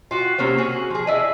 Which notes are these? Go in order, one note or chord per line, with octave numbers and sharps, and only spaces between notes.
F4 F#4
C3 A#3 C#4 C5
F#4 G#4
F3 G#4
E4 D5 D#5